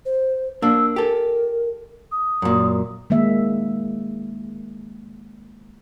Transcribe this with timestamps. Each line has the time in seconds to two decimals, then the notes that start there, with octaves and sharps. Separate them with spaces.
0.06 C5
0.62 A#3 D4 E6
0.96 G4 A4 A#4
2.12 D#6
2.42 F#2 A#2
3.10 D#3 G#3 A#3 E5